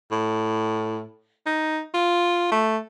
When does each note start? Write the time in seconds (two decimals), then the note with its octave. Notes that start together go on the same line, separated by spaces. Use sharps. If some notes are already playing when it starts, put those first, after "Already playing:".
0.11 A2
1.46 D#4
1.94 F4
2.51 A3